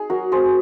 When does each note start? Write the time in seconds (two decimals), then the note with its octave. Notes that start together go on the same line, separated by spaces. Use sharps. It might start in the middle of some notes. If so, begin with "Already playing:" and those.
Already playing: D#4 G#4
0.10 F#3 F#4 A#4
0.32 C4 G#4 C5